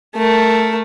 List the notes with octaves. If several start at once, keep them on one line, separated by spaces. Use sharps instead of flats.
A3 A#4